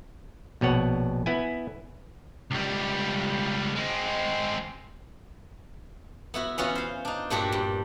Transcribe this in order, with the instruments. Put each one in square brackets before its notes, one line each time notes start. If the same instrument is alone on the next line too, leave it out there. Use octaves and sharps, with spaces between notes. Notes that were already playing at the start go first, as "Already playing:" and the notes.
[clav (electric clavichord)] A#1 B2 C#5 F#5
B3 E4 G#5
[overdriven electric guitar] C#2 G3
G#3 C4
[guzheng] B3 E4 F#4
E3 B3 C#4 F4 F#4
C5 F5
D4 D#4
G2 A#2 F#3 D4 F#4 G4
G2